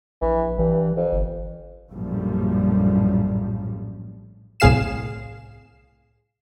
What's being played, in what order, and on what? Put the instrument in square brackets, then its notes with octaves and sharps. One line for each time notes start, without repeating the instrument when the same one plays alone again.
[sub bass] A#1 [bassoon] E3
[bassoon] G2 [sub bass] E3
[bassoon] F2
[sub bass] G1
[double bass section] A#1 F#2 A2 F3 G3
[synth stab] C2 A2 G#4 F5 C7 E7